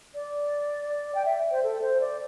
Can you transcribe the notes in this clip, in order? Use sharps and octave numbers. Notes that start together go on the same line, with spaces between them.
D5
G5
E5
C5
A4
C5
D5